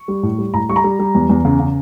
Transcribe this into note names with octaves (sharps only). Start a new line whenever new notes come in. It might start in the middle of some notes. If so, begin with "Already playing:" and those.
Already playing: C#6
G3
A2
G3
A2 A#5
G3 C#6
A#5
G3
G3
E2
E2
C#3
C#3